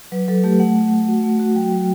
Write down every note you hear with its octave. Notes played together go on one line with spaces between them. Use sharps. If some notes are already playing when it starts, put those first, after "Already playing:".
F#3 B4
F#3 A4
A3 G4
A3 F#5
A3
A3
F#4
A3
F#4
F#3 G5
F#3